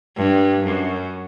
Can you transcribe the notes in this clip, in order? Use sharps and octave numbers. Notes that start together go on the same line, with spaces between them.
G2
F#2